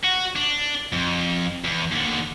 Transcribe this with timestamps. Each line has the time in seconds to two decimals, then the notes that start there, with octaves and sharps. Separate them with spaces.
0.04 F#4
0.36 D4
0.93 F2
1.65 E2
1.92 D#2 D3